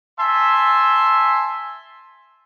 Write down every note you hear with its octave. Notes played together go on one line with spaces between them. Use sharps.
E5 G#5 A5 C6